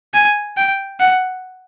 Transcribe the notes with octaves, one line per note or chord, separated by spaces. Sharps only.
G#5
G5
F#5